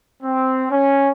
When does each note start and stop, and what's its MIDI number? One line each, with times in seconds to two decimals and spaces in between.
0.23 0.67 60
0.72 1.11 61